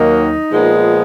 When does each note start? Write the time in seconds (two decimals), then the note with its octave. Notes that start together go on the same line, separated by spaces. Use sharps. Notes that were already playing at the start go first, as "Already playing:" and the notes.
Already playing: D#2 D#3 F#3 A#3 D#4
0.50 A#2 F3 G#3 B3